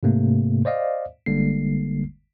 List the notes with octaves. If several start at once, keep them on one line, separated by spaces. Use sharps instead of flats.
G#2 C3 A3 A#3
C5 D5 D#5 F5
G1 D3 G3 G#3 A#3 C7